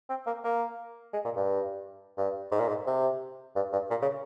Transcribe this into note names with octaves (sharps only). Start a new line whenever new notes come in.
C4
A#3
A#3
G#3
A#2
G2
G2
G#2
A#2
G#2
C3
G2
G2
A#2
C#3